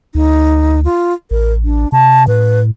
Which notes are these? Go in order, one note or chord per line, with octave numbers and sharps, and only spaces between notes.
D2 D#4
F4
A1 A#4
D4
C3 A5
A2 B4